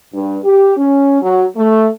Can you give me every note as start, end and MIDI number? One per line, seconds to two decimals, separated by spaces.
0.13 0.38 43
0.43 0.75 67
0.77 1.18 61
1.22 1.44 54
1.56 1.88 57